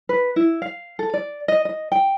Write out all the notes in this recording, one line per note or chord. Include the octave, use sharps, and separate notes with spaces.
B4
E4
F5
A4
D5
D#5
D#5
G5